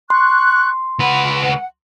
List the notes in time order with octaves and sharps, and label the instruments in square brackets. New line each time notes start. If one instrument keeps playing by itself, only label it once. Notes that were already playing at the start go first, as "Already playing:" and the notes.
[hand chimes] C6 [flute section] C#6 F#6
[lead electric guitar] C#2 B4 [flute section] F#5